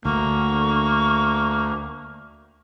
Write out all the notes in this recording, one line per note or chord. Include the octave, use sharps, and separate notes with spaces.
D2 A#3 C#6